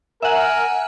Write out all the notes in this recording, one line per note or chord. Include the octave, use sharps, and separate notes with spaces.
A#4 E5 F#5 G#5